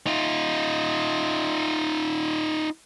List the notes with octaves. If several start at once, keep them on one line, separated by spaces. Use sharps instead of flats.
D#4 F4